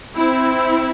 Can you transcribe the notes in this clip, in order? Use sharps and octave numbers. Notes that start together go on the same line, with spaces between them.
C4 E4